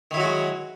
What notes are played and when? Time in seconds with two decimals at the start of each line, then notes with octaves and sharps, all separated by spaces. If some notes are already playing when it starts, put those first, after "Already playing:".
0.11 D#3
0.14 E4
0.17 F#3
0.20 F#4
0.23 G#3